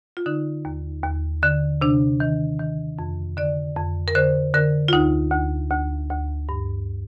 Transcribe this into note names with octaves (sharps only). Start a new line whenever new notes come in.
F4
D3 D#4
D#2
D#2
D3
C3 D4
D#3
D#3
F2
D3 D5
F2
A#4
D3 C5
D3 A#4
F4
D2 D#4
D2
D2
D2
G2